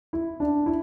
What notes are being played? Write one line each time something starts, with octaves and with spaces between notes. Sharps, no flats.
E4
D4
E4